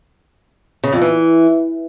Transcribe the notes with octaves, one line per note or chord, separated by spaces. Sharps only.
C#3
F2
E3